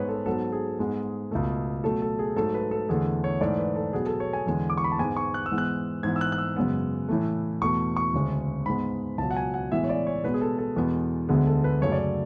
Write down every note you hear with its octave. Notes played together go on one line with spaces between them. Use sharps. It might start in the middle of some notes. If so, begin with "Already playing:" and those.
Already playing: G#2 G#3 B3 B4 C#5
A4
G#2 F#3 B3 A4
G#4
G#2 G#3 B3
C#2 B2 A3
B2 F#3 A3 A4
A4
G#4
G#2 F#3 A3 A4
B4
A4
E2 D3 A3 G#4
C#5
G#2 E3 A3 D5
B4
A4
B2 F#3 B3 G#4
A4
C#5
G#5
E2 D3 G#3
D6
C#6
B5
A5
G#2 G#3 B3 G#5
C#6
F#6
E6
G#2 E3 G#3 B3
F#6
G#2 E3 B3 G#6
E6
F#6
F#6
E6
F#2 C#3 G#3 B3
A2 E3 A3
E2 B2 A3 C#6
C#6
D2 C#3 G#3
G#2 G#3 B3 B5
C#2 B2 F#3 A5
F#5
G#5
F#5
A2 E3 G#3 B3 E5
C#5
D5
C#5
B2 G#3 B3 B4
G#4
A4
A4
E2 B2 G#3 B3
D2 D3 G#3 B3 G#4
A4
B4
F#2 C#3 F#3 A3 C#5
D5
C#5